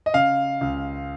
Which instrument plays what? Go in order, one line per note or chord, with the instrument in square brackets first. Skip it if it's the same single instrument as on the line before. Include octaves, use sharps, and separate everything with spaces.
[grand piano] D#5
C#3 F5
C#2